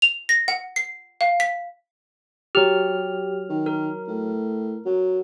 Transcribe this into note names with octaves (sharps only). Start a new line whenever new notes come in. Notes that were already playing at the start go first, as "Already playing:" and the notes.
F7
A#6
F#5
C7
F5
B6
F#3 G4 F6
D#3
A#4
A2
F#3